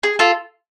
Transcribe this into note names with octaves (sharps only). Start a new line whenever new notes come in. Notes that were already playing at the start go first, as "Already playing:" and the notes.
G#4
F4 A4